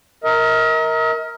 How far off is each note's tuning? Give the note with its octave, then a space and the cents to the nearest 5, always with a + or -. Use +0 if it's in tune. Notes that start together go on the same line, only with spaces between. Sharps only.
A#4 +0 D#5 +45